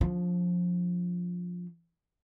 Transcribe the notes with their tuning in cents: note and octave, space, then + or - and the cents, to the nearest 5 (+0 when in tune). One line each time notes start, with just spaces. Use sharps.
F3 +20 D4 -25